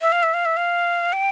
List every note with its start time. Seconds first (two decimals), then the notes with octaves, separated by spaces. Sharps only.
0.02 E5
0.12 F5
0.23 E5
0.34 F5
0.45 E5
0.57 F5
1.13 G5